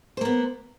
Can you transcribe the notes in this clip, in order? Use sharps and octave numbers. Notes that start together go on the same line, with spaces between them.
A#3 B3 C5